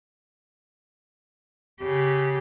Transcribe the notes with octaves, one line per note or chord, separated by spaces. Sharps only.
C#3 G4